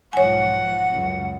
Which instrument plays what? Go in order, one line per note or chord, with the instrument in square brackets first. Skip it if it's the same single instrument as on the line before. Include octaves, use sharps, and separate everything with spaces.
[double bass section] B1 G#2 F3 [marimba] C#5 G#5 [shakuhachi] F#5
[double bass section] C#2 F#2 C#3